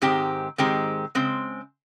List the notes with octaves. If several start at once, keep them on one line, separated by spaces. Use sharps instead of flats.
G#2 D#3 G#3 C4 G4
G#2 D#3 G#3 C4 G4
C#3 G#3 C4